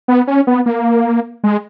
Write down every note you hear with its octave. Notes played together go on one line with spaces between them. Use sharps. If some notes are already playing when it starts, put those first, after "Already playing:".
B3
C#4
B3
A#3
G#3